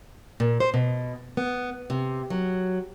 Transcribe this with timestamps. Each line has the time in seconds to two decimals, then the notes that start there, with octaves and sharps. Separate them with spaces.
0.40 A#2
0.60 C5
0.74 B2
1.37 B3
1.90 C3
2.30 F#3